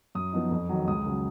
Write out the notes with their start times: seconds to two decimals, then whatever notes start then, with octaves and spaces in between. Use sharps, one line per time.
0.15 F#2 D#6
0.33 F3 B3 D#4
0.51 F2
0.69 D#3 F#3
0.87 C#2 D#6
1.06 C#3 F#3